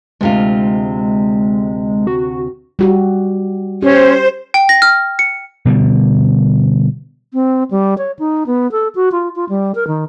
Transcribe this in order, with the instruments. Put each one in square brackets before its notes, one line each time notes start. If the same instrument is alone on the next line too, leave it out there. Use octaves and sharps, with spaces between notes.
[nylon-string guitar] D2 C3 F4 [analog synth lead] G#3
[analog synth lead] F#4
[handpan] G3 F#4 G4
[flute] C#4 [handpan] G4 [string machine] C5
[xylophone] G5
A#6
F6
C#7
[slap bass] B2 D3 G3
[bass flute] C4
G3
C#5
D#4
B3
A4
F#4
F4
F4
G3
A#4
D#3